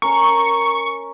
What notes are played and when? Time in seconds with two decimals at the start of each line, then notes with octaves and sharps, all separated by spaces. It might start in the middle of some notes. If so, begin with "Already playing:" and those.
0.02 C#4 A#4 C#6